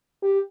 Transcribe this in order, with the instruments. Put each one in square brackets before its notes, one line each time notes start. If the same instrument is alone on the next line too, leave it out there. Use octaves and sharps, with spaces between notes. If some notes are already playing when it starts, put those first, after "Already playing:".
[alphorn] G4